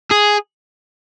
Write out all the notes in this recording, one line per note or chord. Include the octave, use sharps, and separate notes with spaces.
G#4